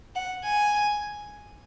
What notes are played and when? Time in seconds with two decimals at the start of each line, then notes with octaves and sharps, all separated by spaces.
0.15 F#5
0.44 G#5